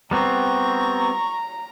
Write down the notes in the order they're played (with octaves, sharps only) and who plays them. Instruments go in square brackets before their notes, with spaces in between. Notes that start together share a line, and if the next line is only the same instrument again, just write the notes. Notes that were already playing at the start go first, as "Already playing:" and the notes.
[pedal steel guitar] G3 B3 C4 [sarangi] A#5 [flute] C#6